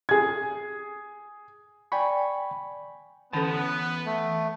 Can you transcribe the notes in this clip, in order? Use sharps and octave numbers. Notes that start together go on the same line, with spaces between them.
G#4 G#6
D5 G5 G#5 B5 C#6
D3 E3 B3 C#4 A4 A5
A3